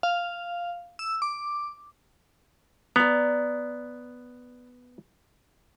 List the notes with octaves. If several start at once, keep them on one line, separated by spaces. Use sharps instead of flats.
F5
E6
D6
B3 D5 A#5